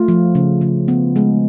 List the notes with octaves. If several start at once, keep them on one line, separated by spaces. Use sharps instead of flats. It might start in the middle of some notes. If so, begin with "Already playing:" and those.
Already playing: A3 F4
F3
C#3
C#3
B3
G#3